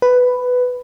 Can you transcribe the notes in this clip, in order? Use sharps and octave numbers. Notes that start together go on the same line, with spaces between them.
B4